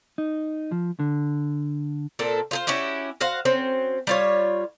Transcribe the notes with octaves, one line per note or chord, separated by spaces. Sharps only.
D#4
F3
D3
A#2 C4 A4
F4 G#4 C5
C#4 E4 F#4 G4
F#4 C5 F5 F#5
F#3 C4 C#4
G3 F4 C#5